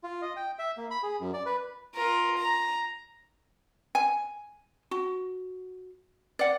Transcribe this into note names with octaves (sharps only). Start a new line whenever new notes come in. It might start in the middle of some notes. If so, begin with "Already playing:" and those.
F4
D#5
G5
E5
A#3
B5
G#4
F#2
D5
B4
F4 A#4
A#5
G#5
F#4
D5 F#5